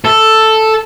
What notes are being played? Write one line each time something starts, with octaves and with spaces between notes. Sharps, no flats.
A4